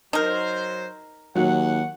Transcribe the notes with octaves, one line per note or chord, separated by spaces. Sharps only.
F#3 D#4 A#4 C5
D#2 F#3 F#5